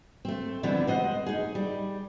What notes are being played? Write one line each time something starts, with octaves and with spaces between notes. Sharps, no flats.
A3 C4
D3 E3 F3 G3 B3 C4
G#3 C5 D#5 F#5
D#4 G#4
G3